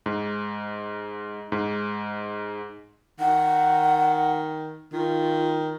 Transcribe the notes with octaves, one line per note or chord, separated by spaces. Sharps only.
G#2
G#2
D#3 F#5
D#3 F4